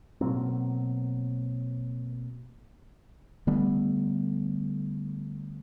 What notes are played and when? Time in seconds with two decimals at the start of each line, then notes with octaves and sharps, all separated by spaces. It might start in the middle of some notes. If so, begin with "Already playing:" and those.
0.21 B2 F#3 A#3 C4
3.47 D3 G3 A3 B3